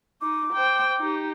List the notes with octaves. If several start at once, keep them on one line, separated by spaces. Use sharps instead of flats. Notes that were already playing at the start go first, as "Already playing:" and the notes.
D#4 D6
C5 G5
D#4 G4